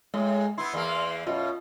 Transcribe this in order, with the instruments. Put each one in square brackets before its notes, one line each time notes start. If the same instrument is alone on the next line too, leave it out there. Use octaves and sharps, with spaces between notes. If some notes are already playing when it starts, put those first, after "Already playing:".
[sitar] A2 [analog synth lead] G#3
[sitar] B3 E4 [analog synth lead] C6
[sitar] E2 A#3
[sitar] F#2 B2 [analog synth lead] F4